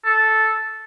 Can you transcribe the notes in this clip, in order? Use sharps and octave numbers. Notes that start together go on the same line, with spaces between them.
A4